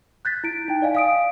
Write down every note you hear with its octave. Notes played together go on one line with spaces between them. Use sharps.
F#6 G6 A6 B6
E4 D7
D#4 G5
D5 D#5 F5 G#5
F5 D#6 D7